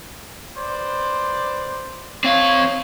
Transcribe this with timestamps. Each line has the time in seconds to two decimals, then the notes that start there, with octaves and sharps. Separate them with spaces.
0.58 B4 C5 D5
2.24 C4 D#4 C#5 F5